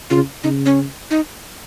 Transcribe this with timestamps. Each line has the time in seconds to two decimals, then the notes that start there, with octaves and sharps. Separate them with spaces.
0.10 C#3 F4
0.43 C#3 D#4
0.66 C#4
1.10 D#4